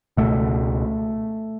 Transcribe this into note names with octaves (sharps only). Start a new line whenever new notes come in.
C#2 B2 A3